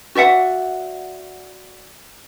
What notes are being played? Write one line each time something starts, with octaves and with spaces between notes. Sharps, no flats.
F#4 D5 E5 F#5